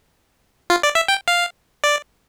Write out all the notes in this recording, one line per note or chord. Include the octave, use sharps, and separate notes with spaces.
F4
D5
E5
G5
F5
D5